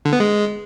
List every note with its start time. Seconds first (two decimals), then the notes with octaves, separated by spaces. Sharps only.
0.05 D3
0.13 B3
0.20 G#3